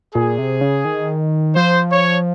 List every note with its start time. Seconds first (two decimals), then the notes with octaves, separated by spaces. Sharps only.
0.15 A#2 G#4
0.38 C3
0.61 C#3
0.85 D#3
1.55 F3 C5
1.91 C#5